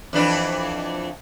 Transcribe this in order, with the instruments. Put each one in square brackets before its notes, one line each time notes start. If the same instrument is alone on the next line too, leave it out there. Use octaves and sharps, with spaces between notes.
[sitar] F2 E3 D4